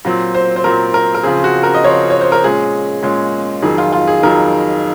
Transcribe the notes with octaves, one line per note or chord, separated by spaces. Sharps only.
A#2 F#3 C4
C5
C5
A#2 F#3 C4 A#4
A#4
A#4
C#3 F3 C4 G#4
F#4
A#4
D#5
C#3 F3 C4 C#5
C#5
C5
A#4
A#2 G#3 C#4 G#4
A#2 G#3 C#4
F2 D#3 F#3 G#4
F4
F4
G#4
F2 D#3 F#3 A#4